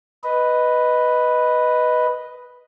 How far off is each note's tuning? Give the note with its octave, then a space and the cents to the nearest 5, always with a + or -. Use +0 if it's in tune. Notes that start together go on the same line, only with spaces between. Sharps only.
B4 +0 D#5 +0